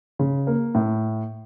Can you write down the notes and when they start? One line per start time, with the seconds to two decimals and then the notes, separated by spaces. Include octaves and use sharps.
0.19 C#3
0.47 A#3
0.75 A2